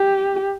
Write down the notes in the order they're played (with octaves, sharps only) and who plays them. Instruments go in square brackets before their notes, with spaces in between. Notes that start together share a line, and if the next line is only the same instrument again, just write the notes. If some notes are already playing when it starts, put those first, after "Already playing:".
Already playing: [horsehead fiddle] G4